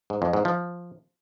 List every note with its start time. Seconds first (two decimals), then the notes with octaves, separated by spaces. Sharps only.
0.10 G#2
0.22 F2
0.33 G#2
0.45 F3